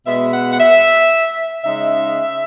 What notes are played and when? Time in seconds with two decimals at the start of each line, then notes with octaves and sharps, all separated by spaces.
0.05 B2 G#3 B3 E5
0.32 F#5
0.52 F#5
0.59 E5
1.63 C#3 G#3 D#4 E5